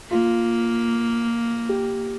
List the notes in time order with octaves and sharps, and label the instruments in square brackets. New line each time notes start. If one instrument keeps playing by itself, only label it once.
[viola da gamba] A#3 [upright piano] F4
[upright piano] G4